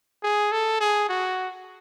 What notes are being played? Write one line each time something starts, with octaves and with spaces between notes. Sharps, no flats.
G#4
A4
G#4
F#4